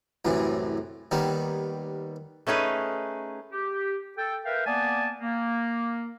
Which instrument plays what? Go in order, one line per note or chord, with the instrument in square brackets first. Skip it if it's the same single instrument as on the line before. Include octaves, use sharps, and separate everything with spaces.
[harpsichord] C2 F#2 A2 E3
D#2 D#3 G3 B3
[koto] A3 C#4 D#4 G#4 B4
[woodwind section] G4
A4 G5
A#4 B4 E5 F5 G5
A#3 B3 D5 G#5 A5
A#3